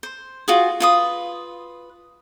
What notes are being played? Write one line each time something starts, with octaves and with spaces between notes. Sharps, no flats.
C5
F4 F#4 G#4
F4 B4 D#6